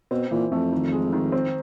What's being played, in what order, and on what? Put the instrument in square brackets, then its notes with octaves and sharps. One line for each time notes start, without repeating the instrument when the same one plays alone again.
[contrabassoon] B2 [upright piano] C4
[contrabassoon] A#2 [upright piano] E3
[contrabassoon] F2 [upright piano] A3
[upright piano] D#3
G#3
D#3
C4